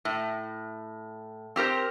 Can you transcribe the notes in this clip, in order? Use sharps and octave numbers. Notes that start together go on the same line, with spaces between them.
A2
C4 G4 A#4 C5